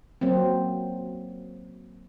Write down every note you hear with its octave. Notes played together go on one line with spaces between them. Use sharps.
F#3 A#3 C4